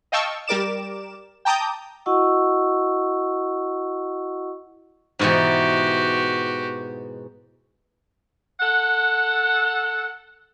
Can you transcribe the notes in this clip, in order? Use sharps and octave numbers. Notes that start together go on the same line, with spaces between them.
D#5 F5 G5 A5 C#6 E6
G3 G4 A#4 D5 D6 E7
G5 A5 A#5 D6 D#6 G6
E4 F#4 D#5 F#5 C#6 E6
G#2 B2 E3 F#4 G4
A4 F#5